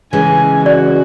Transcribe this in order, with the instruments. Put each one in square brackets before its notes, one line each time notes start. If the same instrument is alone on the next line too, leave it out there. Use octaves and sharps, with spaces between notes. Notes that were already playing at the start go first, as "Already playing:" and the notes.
[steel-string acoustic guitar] C#3 E3 G#3 [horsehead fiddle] G#5
[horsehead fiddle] F#4 [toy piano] D5